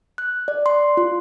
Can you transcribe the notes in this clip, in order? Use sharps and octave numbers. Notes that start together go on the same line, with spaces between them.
F#6
D5
C6
F4